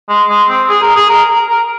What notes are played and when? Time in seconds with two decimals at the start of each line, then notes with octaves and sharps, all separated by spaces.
0.09 G#3
0.29 G#3
0.49 C4
0.69 G#4
0.82 A#4
0.96 G#4
1.09 A#4
1.29 A#4
1.49 A#4